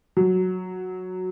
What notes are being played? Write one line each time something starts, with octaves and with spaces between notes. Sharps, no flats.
F#3